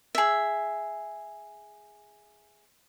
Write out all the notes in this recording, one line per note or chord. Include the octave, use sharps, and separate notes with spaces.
G#4 E5